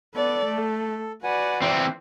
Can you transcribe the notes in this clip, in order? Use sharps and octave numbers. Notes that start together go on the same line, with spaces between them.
B3 A4 D5
A3
F#4 B4 D5 F#5 G#5
E3 C4 E5